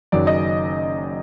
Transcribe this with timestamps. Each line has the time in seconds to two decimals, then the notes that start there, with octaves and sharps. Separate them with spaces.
0.12 F#1 F#2 D#3 F#3 D5
0.27 D#5